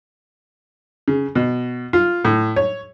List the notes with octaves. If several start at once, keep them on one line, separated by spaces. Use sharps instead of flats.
C#3
B2
F4
A2
C#5